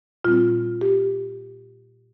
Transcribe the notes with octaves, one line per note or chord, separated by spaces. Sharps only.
A#2 G3 C4 F4
G4